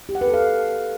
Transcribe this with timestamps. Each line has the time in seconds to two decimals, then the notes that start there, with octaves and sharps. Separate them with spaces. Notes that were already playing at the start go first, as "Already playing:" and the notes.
0.09 G4
0.15 F#5
0.21 B4
0.27 A4
0.34 F5